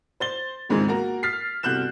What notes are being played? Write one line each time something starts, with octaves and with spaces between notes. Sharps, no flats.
C5 A6 G7
E1 C#2 G#2 D#3 C4 G#4
A#3 F#4 A#4 A#5
F6 A6 B6 C7
G1 C3 F#4 F#6 G6 E7